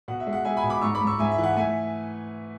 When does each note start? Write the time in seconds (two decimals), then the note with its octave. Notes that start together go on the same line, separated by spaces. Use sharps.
0.08 B2 F#5
0.20 E5
0.27 G#3
0.33 F#5
0.45 G#3 E5 G#5
0.57 G#5 B5
0.64 B2
0.70 B5 D6
0.81 G#2 C#6 E6
0.95 B5 D6
1.01 G#2
1.07 C#6 E6
1.19 G#2 E5 G#5
1.31 E5
1.38 E3
1.44 F#5
1.56 A3 E5 G#5